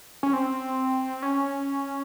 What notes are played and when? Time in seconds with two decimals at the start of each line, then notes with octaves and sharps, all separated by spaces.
0.23 C#4
0.33 C4
1.23 C#4